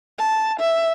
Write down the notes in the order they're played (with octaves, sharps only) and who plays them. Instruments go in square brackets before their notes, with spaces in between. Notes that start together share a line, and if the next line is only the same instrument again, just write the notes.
[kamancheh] A5
E5